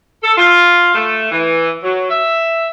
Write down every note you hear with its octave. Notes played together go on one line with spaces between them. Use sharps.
A4
F4
A3
E3
F#3
E5